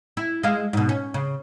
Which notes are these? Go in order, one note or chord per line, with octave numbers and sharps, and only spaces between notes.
E4
G#3 E4 F5
G#2 B2
C#4
C#3